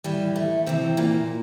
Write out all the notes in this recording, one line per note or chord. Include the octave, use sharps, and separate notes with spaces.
A2 E3 G3
A3
A2 C3 E3 C4
A#2 A#3